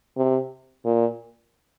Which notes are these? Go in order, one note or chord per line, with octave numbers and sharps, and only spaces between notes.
C3
A#2